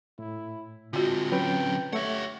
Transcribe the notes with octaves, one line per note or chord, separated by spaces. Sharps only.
A2 E4
D3 G#3 C4 F4 F#4
F#3 C#4 B4 G5
A3 G4 C#5 E5 F#5